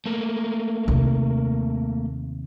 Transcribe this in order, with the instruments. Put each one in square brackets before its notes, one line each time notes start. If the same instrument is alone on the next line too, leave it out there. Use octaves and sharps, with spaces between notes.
[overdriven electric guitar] A3 A#3
[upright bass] D#2 C3